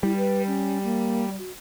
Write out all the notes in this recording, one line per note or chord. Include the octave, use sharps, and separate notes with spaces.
G3 E4
B4
C#4
A#3
F#4